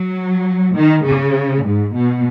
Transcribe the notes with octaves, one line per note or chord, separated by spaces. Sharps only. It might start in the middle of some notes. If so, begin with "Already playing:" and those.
Already playing: F#3
D#3
C#3
G#2
B2